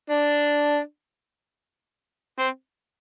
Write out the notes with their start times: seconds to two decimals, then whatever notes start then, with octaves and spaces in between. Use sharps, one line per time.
0.10 D4
2.39 C4